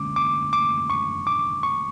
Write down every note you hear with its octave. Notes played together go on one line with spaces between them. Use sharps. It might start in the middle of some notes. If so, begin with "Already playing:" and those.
Already playing: D2 D3 G#3 C#4 D6
D6
D6
C#6
D6
C#6